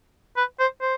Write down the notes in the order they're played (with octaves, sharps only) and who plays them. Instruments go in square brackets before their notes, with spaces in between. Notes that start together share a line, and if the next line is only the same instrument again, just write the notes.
[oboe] B4
C5
C5